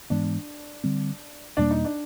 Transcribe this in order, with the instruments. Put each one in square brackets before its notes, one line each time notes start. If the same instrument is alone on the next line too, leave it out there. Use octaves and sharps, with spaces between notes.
[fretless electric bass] G#2 E3 G#3 B3 [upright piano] D4
[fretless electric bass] D3 G3 C4
[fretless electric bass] E2 B2 G3 A#3 [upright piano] D4
[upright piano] D#4
D4